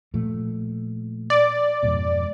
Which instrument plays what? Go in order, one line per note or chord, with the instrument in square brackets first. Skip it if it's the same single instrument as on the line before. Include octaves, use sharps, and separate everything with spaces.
[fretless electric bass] A#2 F3 A3
[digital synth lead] D5
[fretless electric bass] F2 G#2 B2